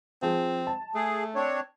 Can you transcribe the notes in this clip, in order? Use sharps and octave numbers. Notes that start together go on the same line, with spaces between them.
F3 C4 G#4
A5
A3 G#4
C4 D4 C#5